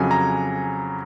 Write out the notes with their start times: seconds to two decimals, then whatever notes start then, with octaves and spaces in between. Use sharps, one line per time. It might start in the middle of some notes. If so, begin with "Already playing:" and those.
Already playing: F2 C#3 F#3 G#5
0.11 A#5